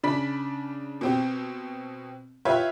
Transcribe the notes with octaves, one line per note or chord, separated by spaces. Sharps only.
C#3 D4 B5 B6
B2 C4 G4
F4 G4 B4 C#5 E5